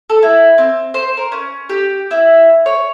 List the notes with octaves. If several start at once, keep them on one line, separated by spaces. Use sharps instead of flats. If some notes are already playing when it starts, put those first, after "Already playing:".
A4
E4
C4
C5
A#4
C#4
G4
E4
C#5